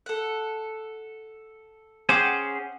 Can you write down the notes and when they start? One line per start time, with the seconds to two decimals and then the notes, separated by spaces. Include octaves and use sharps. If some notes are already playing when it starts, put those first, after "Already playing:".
0.06 A4 F#5
2.09 C#4 G#4 C5 F#5 G5 D6